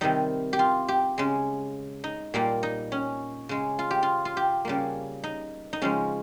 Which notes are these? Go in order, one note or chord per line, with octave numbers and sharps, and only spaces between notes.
C3 D#3 G3 D#4
G4
F4
G4
C#3 G#3
D#4
A#2 G3 A#3
D#4
C#4
C#3 G#3
F4
G4
F4
F4
G4
C#3 G3 A#3
D#4
D#4
C#3 F3 G#3 C#4